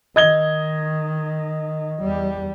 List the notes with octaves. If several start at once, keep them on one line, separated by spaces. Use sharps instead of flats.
D#3 D#5 G#6 G7
E2 G3